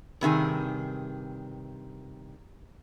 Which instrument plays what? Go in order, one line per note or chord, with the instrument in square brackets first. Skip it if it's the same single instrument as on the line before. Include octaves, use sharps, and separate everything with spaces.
[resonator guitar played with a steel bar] G2 C3 D#3 G#4